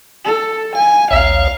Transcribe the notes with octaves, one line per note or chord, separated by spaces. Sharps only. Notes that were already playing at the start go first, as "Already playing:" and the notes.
A4
F5 G#5
A#1 D#2 C#5 F5